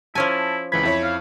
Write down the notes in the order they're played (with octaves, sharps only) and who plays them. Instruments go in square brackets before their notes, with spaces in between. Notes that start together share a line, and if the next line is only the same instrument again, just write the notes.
[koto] F3 C#4 G#5 [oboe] E4 [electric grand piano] A5
[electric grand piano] C#2 E3 G#6 [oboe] B5
[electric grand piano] F2 E4 C#5
[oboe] F5